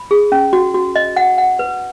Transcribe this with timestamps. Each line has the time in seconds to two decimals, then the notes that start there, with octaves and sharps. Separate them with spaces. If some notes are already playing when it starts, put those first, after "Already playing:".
Already playing: B5
0.11 G#4
0.32 C#4
0.53 F#4
0.74 F#4
0.96 D#5
1.16 F#5
1.38 F#5
1.59 B4